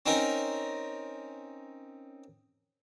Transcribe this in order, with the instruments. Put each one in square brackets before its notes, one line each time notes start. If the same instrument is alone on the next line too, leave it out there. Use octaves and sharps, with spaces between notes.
[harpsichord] C4 C#4 D#4 A#4